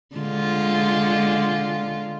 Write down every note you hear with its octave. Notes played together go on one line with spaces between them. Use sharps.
D3 G#3 F4